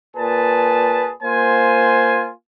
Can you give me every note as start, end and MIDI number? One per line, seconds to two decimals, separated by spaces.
0.16 1.11 46
0.16 1.11 68
0.16 1.11 71
0.16 1.11 81
1.23 2.30 58
1.23 2.30 65
1.23 2.30 72
1.23 2.30 80